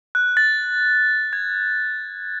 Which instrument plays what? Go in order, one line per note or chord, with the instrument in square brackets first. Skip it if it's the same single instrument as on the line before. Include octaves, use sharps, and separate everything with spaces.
[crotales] F#6
A6
G#6